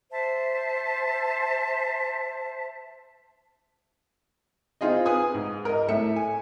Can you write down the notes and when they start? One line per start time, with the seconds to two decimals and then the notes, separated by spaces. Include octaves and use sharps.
0.11 C5 E5 A5
4.81 C4 D#4 F4 G#4 D#5
5.06 G#4 B4 G#5 D#6
5.34 G#2
5.65 A#4 D#5
5.88 A2 A3 E5 C#7
6.16 G#5